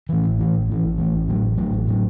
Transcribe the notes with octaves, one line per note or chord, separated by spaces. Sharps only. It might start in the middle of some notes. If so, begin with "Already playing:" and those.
A2 E3
A1
A2 E3
A1
A2 E3
A1
A2 E3
A1
A2 F#3
A1
A2 F#3
A1
A2 F#3